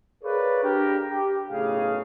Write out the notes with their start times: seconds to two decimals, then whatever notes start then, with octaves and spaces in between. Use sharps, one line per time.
0.24 G#4 A#4 B4 C#5 D5 F5
0.63 D4 G4 A#4
1.10 G4
1.50 B1 A2 C#3 G#4 F5